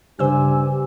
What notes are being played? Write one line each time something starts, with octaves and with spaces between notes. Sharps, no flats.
G2 C#3 G4 C5 G#5 E6